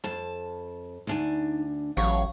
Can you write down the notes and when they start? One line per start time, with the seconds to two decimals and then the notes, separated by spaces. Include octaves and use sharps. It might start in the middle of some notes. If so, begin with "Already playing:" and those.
0.04 F2 A5
1.07 D2 D4 D#4 G#5
1.97 A1 F#3 C#5 F5